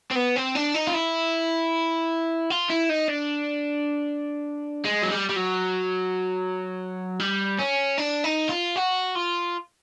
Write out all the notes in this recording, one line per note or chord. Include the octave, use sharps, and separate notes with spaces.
C4
B3
C4
D4
D#4
F4
E4
F4
E4
D#4
D4
G#3
F#3
G3
G3
F#3
G3
C#4
D4
D#4
F4
F#4
F4